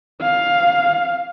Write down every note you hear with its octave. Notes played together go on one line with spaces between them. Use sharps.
F5